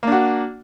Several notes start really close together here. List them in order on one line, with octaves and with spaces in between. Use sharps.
A#3 D4 F#4